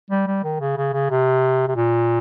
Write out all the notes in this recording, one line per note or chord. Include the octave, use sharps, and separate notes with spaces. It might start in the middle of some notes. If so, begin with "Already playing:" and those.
G3
G3
D#3
C#3
C#3
C#3
C3
C3
A#2